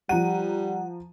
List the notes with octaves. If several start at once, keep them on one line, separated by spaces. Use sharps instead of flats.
F3 G3 F#5 A#5 D#7